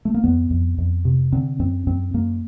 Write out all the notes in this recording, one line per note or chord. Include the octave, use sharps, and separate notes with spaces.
A3
A#3
F2 B3
F2
F2
C3
D3 C4
F#2 C4
F#2 C4
F#2 A#3